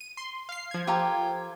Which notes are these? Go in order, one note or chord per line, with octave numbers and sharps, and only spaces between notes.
D#7
C6
F5 C7
F3 G#6
F4 G4 A4 A#4